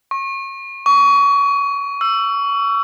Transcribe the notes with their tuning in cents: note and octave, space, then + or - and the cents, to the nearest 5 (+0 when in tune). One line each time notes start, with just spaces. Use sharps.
C#6 -30
C#6 +30
E6 +25